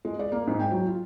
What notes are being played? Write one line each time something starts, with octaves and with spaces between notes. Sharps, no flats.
G#3
D5
A#3
G#2
G5
F#3
F4